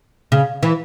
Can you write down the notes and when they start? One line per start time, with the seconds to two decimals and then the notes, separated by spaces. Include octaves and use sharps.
0.32 C#3
0.63 E3